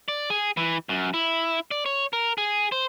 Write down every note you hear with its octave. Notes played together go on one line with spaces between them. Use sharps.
D5
G#4
E3
F#2
E4
D5
C#5
A#4
G#4
C5